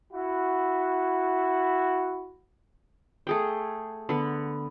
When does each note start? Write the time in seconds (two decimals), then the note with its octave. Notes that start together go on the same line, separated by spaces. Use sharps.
0.13 E4 F#4
3.27 A3 G#4 G5
4.09 D3 B3